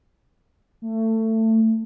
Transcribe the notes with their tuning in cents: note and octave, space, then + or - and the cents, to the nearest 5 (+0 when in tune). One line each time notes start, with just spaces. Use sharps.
A3 +20